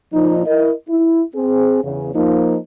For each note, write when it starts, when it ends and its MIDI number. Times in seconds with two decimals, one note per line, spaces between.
0.13 0.42 46
0.13 0.42 53
0.13 0.42 63
0.46 0.72 64
0.46 0.72 70
0.46 0.72 75
0.88 1.22 64
1.35 1.80 60
1.35 1.80 68
1.83 2.11 40
1.83 2.11 49
2.15 2.57 53
2.15 2.57 58
2.15 2.57 63